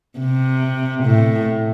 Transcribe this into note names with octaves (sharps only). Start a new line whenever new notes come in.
C3
A2